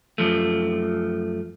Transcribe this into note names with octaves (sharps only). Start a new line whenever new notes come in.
F#2 F3 A3